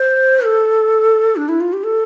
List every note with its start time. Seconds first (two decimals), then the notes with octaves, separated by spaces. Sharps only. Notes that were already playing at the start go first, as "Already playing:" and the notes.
Already playing: C5
0.45 A4
1.36 D4
1.49 E4
1.61 F4
1.73 G4
1.84 A4